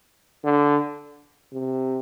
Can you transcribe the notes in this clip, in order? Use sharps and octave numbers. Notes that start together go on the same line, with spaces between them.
D3
C3